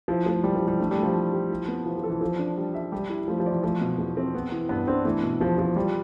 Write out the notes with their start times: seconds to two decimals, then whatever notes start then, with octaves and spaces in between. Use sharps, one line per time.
0.08 F3 E4
0.26 F3 A3
0.44 E3 G3
0.56 F3
0.62 E3
0.68 G3
0.79 A3 D4
0.91 G3
0.97 A3
1.03 F3
1.15 E3
1.33 G4
1.50 E4
1.68 B3
1.86 E3 F3
1.98 F3
2.03 A4
2.10 E3
2.21 F3 A4
2.39 D4
2.57 G3
2.74 E5
2.92 G3 G4
3.09 E4
3.28 F3 A3
3.40 F3
3.46 E3 D5
3.63 F3 A3
3.81 B2
3.98 E2
4.17 C4
4.34 B3
4.52 E3
4.69 G2 B3
4.87 C4 D4
5.05 E3 A3
5.23 B2
5.40 E2 F3
5.58 E2 F3
5.76 F3 G3